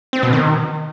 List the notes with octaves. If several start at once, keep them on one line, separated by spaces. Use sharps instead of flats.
C4
B2
D#3